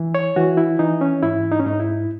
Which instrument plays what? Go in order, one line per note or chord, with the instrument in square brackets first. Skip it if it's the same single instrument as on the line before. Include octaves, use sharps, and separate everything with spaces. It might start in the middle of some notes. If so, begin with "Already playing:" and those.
Already playing: [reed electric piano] E3
C#5
E3 F#4
E4
E3 D#4
C#4
G#2 E4
D#4
C#4
G#2 D#4
E4